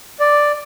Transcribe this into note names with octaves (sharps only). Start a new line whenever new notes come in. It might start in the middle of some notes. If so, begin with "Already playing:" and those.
D5